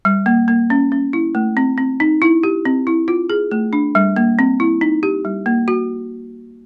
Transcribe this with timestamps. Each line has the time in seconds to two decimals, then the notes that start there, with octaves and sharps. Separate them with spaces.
0.05 G3
0.26 A#3
0.48 A#3
0.70 C#4
0.92 C#4
1.13 E4
1.35 A3
1.57 C4
1.78 C4
2.00 D#4
2.22 E4
2.43 G4
2.65 C4
2.87 E4
3.08 F4
3.30 G#4
3.51 A3
3.73 D4
3.95 G3
4.16 A#3
4.39 C4
4.60 E4
4.81 D#4
5.03 G4
5.25 G3
5.46 A#3
5.68 F#4